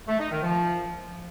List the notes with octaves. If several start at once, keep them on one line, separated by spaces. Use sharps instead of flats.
A3
D#4
D#3
F3